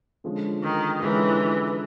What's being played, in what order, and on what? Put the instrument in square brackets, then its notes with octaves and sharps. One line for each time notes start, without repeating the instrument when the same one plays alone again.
[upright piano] D3 F3 G#3 C#4
[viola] D#3
[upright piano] D3 F3 G#3 C#4 [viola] E3